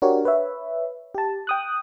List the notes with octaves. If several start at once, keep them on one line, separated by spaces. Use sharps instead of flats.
D4 F#4 G4 A#4 C#5
B4 C#5 E5
G4 A5
G5 D#6 F#6